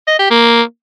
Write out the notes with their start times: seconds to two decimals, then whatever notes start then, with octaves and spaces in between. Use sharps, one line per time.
0.07 D#5
0.19 G4
0.30 A#3